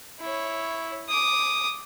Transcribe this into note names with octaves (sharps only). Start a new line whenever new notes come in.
E4 C#5
D6 D#6